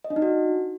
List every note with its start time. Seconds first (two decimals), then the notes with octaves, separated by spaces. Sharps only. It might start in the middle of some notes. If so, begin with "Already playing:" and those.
0.04 D#5
0.10 D4
0.16 D#4
0.22 F#4